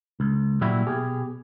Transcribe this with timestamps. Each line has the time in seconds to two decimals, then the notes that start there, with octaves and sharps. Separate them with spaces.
0.20 C#2
0.61 A#2 F#3 G3 E4 F#4
0.87 B2 G4 G#4